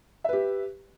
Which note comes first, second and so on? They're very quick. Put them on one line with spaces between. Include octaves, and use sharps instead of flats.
E5 B4 G4